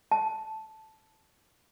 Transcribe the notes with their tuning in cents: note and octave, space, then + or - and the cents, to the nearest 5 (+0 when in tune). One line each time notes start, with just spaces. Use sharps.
A5 -5